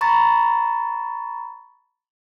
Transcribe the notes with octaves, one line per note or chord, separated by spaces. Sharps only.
A#5 B5 C#6 A6